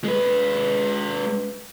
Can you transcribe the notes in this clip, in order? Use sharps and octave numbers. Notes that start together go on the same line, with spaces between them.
G#3 B4